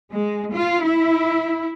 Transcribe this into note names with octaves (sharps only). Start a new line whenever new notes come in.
G#3
F4
E4